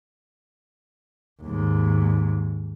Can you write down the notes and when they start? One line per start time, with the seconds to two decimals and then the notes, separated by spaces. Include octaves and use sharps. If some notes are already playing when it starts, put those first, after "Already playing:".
1.42 D#2 G#2